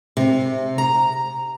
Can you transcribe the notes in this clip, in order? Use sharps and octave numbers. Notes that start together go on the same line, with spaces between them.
C3
A#5